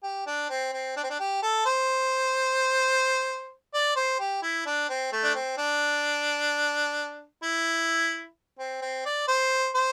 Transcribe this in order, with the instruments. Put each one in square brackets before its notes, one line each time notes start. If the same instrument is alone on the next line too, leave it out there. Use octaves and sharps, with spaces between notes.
[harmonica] G4
D4
C4
C4
D4
C4
D4
G4
A4
C5
D5
C5
G4
E4
D4
C4
A3
D4
C4
D4
E4
C4
C4
D5
C5
C5